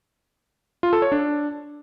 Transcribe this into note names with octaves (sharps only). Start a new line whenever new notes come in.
F4
A4
C#5
D4